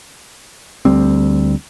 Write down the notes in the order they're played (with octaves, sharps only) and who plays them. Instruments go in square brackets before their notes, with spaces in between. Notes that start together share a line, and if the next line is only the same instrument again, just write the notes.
[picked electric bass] D2 G3 C4